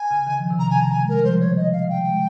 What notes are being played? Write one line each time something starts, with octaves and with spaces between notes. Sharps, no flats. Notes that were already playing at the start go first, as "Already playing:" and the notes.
Already playing: G#5
C#3
D#3
F3
C3 D#3
A#5
G#5
A#5
G#5
G#3
A#4
G3
C#3 F3 C5
C#5
D#5
F5
G5
G#3